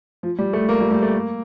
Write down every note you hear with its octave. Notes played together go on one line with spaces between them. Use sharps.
F3
G3
A3
A#3
G3
G3
A3
A#3